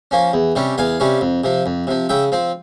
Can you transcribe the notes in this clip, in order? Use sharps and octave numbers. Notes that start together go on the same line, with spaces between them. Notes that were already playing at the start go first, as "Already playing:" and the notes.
F3 A#3 C#4
E2
C3 G3 C#4
E2 F5 G#5
C3 G3 C#4
F2
C3 F3
F2
C3 F3
C#3 E5 G5
F3 C4